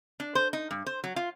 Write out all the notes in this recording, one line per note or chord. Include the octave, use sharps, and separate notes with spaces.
D4
C5
D#4
G2
C5
F#3
F4